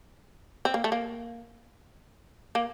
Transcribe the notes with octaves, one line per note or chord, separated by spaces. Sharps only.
C4
A#3
A3
A#3
A#3